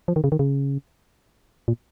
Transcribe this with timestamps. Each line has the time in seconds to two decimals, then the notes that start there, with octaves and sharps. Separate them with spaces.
0.08 F3
0.16 D#3
0.24 C#3
0.32 D#3
0.39 C#3
1.68 A#2